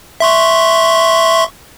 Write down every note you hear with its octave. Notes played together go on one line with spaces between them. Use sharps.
E5 C6 C#6